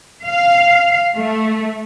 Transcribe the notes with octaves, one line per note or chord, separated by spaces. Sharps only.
F5
A3